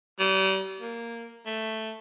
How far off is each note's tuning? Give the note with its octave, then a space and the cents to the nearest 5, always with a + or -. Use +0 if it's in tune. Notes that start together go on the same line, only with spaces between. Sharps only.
G3 -40
A#3 -5
A3 +0